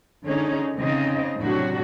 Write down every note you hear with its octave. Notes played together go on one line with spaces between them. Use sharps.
D3 C#4 D#4 G#4
C#3 C4 D#4 D#5
A2 C3 F#3 D4 F#4